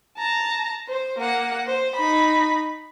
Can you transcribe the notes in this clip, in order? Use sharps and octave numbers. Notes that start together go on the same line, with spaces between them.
A5 A#5
C5
A#3 F#5
C5
D#4 B5